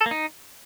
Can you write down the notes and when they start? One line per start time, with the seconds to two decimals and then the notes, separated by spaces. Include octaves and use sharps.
0.01 A4
0.06 A#3
0.11 D#4